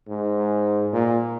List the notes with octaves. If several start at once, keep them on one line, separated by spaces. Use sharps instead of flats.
G#2
A#2